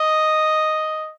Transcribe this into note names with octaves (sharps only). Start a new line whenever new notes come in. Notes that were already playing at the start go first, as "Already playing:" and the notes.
Already playing: D#5